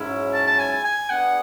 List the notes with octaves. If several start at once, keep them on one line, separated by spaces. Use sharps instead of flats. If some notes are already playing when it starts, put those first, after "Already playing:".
Already playing: G#2 F#3 C#4 E4
A5
A5
G#5
G#5
B3 D4 G#4 F#5